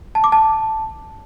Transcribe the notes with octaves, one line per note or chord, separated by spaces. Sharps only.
A5
D6
A5